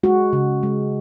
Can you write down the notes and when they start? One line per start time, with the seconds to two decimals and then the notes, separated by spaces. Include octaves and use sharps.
0.03 G#3 F#4
0.33 C#3
0.63 G#3